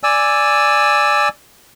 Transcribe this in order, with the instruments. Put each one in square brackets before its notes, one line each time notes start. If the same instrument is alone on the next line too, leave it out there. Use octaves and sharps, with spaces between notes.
[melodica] D5 G#5 E6